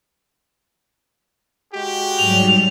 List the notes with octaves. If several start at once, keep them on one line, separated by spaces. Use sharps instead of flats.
G#3 F#4 G4
G#2 F#3 G3 F7